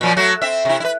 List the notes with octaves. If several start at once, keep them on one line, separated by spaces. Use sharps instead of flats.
A#2 F3 F#3
F#3 A3 F#4
C4 E5
C3 E4
E4 B4